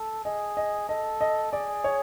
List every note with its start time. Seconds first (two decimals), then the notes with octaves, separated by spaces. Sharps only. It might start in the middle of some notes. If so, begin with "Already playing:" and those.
Already playing: A4
0.25 G#4 D#5
0.57 D#5
0.89 A4 D#5
1.21 D#5
1.52 G#4 D5
1.84 C#5